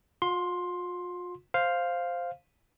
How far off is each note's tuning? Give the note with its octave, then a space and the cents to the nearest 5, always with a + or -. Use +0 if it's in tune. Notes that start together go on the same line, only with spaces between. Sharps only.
F4 +40 C6 +10
C5 +0 F5 +0